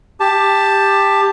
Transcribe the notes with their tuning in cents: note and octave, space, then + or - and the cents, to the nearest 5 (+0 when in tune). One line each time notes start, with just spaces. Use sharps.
G4 +15 A5 +0